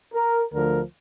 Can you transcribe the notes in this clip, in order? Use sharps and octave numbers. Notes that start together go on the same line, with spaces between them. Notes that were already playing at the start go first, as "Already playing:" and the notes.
A#4
D2 D3 F3 A3 A#4